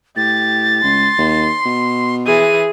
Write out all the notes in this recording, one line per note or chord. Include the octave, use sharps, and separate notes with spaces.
A2 G4 A6
C#2 C6
D#2
B2
E3 G#4 D#7